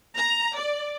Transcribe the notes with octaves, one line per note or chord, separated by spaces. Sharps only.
A#5
D5